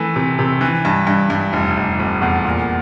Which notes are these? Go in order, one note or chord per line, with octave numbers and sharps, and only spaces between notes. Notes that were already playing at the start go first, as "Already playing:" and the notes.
Already playing: E3 A3
C3
C3
E3
G2
G2
G2
F1
F1
F1
E2
A#2